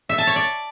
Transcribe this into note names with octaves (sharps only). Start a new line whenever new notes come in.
E5
A5
C#5
D5